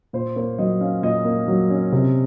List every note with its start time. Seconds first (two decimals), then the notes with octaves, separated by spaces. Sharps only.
0.13 A#2 C5
0.36 A#3 C#5
0.58 F#3 D#5
0.80 C#4 F5
1.03 A#2 D#5
1.25 A#3
1.48 F#3
1.70 C#4
1.92 C3